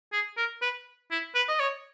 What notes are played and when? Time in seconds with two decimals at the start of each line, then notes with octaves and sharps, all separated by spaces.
0.12 G#4
0.37 A#4
0.62 B4
1.11 E4
1.35 B4
1.48 D#5
1.60 C#5